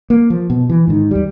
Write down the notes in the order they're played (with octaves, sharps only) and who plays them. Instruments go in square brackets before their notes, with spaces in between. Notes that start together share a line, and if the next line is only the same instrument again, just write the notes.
[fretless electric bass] A#3
F3
B2
E3
G#2 D#3
D#2 G3